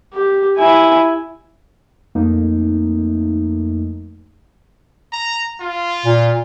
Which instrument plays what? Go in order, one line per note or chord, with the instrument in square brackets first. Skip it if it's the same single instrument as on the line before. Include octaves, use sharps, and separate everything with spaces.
[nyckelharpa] G4
E4 G#5
[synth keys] F2 A3 A#3 D#4
[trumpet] A#5
F4
[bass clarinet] A#2